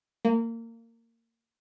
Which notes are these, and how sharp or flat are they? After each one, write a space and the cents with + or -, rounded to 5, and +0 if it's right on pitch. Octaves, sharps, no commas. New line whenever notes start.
A#3 -25